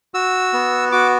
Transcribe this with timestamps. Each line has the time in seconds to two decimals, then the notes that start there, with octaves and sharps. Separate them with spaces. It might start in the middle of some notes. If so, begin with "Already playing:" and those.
0.14 F#4 E6
0.53 B3
0.92 F#4 D6